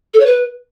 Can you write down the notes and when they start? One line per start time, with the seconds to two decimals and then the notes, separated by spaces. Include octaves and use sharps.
0.13 A4
0.19 C#5
0.26 B4